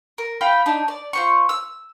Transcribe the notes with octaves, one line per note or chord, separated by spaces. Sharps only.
A#4
F4 G5 B5
D4 D#4
D5
F4 C5 C#6
E6